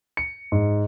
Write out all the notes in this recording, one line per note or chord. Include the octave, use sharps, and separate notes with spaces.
C#7
G#2